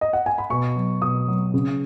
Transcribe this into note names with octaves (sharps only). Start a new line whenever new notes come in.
D#5
F#5
G#5
B5
B2 C#6
F#3
B2 D#6
F#3
C#3